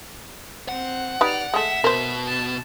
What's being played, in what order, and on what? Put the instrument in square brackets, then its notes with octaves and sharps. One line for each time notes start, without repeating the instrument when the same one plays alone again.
[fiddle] C4 [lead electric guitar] F#5
[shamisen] D#4 G4 B4 [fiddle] D5 F6
[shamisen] G#3 A3 [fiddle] E5
[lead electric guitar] B2 [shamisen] A#4 C5
[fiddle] A5